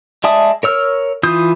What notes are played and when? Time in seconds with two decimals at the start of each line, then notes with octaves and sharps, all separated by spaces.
0.24 G#3 D5 E5 A5 D#6
0.63 A#4 C#5 E6 F6
1.23 E3 F4 D#6 G6